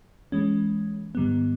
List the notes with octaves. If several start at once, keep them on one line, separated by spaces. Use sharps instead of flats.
E3 G#3 C#4
G#2 D#3 G3 B3